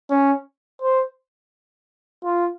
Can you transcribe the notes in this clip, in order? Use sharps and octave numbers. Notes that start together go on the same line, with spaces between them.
C#4
C5
F4